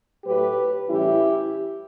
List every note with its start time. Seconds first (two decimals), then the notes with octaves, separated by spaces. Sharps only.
0.25 A2 F#3 A3 G4 B4
0.90 A2 E3 G3 C#4 E4 G4